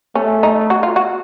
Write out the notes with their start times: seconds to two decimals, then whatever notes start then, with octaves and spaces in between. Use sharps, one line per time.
0.15 A3 C#4
0.43 D#4
0.70 F#4
0.83 F4
0.96 F#4